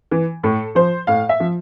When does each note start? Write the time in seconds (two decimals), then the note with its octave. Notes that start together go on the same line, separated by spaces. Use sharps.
0.11 E3
0.43 A2 A4
0.75 F3 C5
1.07 A2 F5
1.29 E5
1.40 F3